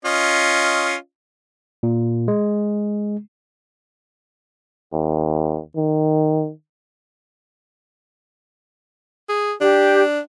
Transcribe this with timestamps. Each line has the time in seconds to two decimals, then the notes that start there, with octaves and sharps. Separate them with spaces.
0.05 C#4 F4 D#5
1.83 A#2
2.28 G#3
4.93 D#2
5.76 D#3
9.29 G#4
9.61 D4 G4